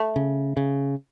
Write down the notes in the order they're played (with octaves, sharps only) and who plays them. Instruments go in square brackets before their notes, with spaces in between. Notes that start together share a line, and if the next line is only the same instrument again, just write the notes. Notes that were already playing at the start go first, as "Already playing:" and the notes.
Already playing: [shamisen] A3
[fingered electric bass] C#3
C#3